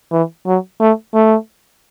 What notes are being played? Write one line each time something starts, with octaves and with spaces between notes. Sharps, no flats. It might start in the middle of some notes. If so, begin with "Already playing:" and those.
E3
F#3
A3
A3